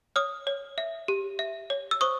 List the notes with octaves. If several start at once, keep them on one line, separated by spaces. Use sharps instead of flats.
C#5 D#6 F6
C#5
E5
G4
E5
C#5
E6
C5 C#6 D#6